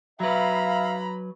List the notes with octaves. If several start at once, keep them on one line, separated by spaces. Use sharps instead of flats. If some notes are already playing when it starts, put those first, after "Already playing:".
F#3 B4 E5 F5 A#5 B5